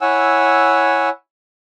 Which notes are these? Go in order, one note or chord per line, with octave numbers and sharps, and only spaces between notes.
E4 C#5 F#5 G#5 E6